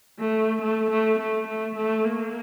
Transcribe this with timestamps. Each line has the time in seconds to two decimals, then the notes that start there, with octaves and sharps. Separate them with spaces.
0.20 A3
0.62 A3
0.90 A3
1.19 A3
1.47 A3
1.76 A3
2.04 A#3